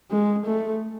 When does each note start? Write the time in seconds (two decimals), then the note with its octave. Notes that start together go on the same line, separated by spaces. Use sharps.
0.11 G#3
0.46 A3